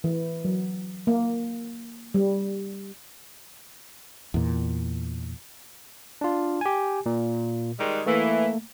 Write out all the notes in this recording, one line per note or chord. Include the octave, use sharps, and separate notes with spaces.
E3
F#3
A#3
G3
E2 A#2
D4 F4
G4 G#5
A#2
D#3 G3 G#3
E3 A3 A#3